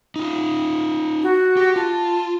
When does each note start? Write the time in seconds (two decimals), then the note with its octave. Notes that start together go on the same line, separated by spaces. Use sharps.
0.16 D#4 F4
1.22 F#4
1.57 G4
1.76 F4 A5